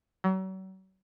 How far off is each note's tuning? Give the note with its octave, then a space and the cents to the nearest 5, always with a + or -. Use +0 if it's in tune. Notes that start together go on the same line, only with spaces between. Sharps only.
F#3 +40